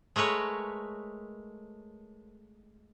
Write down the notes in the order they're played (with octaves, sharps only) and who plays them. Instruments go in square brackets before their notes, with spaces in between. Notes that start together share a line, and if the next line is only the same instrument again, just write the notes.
[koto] G#3 A3 A#4 B4 C#5